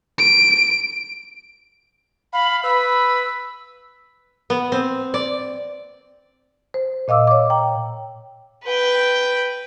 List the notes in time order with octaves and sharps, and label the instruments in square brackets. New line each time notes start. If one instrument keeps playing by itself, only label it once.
[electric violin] D7
[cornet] F5 [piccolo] B5
[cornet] B4 [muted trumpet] B5 [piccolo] E6
[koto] B3
C4
D5
[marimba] C5
A#2 D#5 F5 D6 E6
C#5 D6
G5 A#5
[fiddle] B4 G5